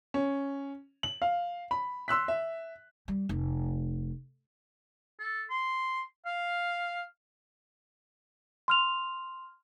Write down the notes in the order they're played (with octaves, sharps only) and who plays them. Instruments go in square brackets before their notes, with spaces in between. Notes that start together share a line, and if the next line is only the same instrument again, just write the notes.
[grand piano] C#4
F#7
F5
B5
C6 E6 F#6 B6
E5
[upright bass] G3
F1
[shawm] A4
C6
F5
[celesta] C6 F6 F7